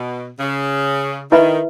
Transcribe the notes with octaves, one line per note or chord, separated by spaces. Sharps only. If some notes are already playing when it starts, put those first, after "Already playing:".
Already playing: B2
C#3
D#3 E4 B4 E5 B5